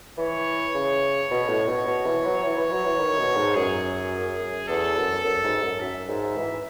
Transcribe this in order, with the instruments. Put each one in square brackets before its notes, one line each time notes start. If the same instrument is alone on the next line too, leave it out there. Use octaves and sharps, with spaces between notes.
[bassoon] E3 [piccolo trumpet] C#5
[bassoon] C#3
B2
A2
B2
B2
E3
F#3
[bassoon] E3 [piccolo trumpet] C#5
[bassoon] E3
F#3
E3
D#3
B2
G#2
[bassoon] F#2 [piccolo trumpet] G#4
[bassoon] E2 [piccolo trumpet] A4
[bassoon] F#2
F#2
G#2
F#2
[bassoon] F#2 [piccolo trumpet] E5
[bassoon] G#2
E3